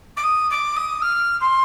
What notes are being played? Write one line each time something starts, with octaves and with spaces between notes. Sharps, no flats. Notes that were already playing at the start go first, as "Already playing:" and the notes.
D6
D#6
D6
D#6
F6
C6